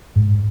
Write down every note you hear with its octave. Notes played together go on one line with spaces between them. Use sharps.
G#2